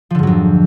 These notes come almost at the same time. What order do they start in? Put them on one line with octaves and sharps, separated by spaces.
F3 D3 G#2 F#3 F2